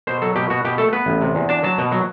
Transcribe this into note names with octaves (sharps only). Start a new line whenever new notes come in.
B2 C5
F#3 A4
B2 G4
B2 F#4
B2 G4
A3 A4
B3 B4
A1
C3
E2
D4 A5
F#3 A5
B2
F#3